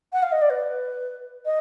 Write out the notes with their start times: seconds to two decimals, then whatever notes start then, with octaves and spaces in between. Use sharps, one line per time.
0.12 F#5
0.22 F5
0.32 D#5
0.41 D5
0.49 B4
1.45 D#5